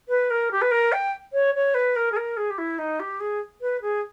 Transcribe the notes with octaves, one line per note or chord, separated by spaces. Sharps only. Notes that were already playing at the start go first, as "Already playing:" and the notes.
B4
A#4
G4
B4
A#4
G5
C#5
C#5
B4
A#4
G#4
A#4
G#4
G4
E4
D#4
G4
G#4
B4
G#4